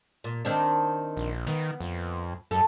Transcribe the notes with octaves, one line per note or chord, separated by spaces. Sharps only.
A#2
D#3 C4 D4
A#1
D#3 B3
F2
F#2 A4